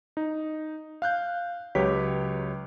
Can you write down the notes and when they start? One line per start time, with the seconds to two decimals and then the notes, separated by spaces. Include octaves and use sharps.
0.17 D#4
1.02 F5 F#6 G6
1.75 C#2 F#3 G4 B4 C#5 B6